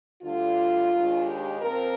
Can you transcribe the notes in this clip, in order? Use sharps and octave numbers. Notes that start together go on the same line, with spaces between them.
D2 D3 G3 F4
D#2 D#3 G#3 D4
G4
A#2 F3 C4 A#4